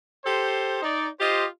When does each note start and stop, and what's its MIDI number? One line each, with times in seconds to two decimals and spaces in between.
0.24 0.80 67
0.24 0.80 69
0.24 0.80 72
0.82 1.08 63
0.82 1.08 74
1.20 1.45 65
1.20 1.45 67
1.20 1.45 72
1.20 1.45 75